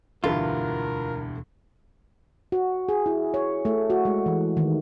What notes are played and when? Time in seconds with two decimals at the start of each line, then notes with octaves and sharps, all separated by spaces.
0.24 E1 D2 G2 B2 D3 E3 F4 A#4
2.52 F#4
2.89 G#4
3.06 E4
3.34 C#5
3.65 A3
3.90 F#4
4.05 G#3
4.26 E3
4.57 D#3